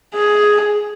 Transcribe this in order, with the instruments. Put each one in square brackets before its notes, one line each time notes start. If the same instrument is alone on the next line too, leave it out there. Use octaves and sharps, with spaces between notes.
[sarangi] G#4